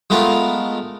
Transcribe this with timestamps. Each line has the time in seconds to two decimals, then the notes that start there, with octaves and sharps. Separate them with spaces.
0.10 G#3 A3 B3 F4 A#4